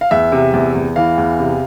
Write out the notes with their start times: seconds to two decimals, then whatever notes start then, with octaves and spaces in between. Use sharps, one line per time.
0.01 F5
0.11 E2 E5
0.32 C3
0.53 E2
0.75 E2
0.96 E3 F5
1.18 E2
1.39 C3